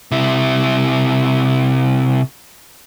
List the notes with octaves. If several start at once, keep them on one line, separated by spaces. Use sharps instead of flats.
C3 E4